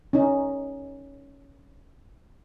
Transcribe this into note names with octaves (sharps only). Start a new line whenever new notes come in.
C#4 D#4